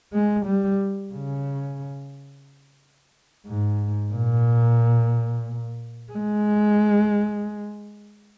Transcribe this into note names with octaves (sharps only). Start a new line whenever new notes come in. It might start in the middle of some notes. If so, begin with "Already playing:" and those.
G#3
G3
C#3
G#2
A#2
G#3